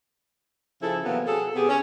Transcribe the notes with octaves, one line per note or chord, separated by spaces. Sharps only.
C#3 F3 E4 A4
C3 E3 F#3 A#3 B3
F#3 G#4 A4
C3 B3 G4 G#4
C#4